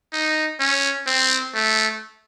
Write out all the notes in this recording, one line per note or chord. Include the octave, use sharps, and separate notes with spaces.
D#4
C#4
C4
A3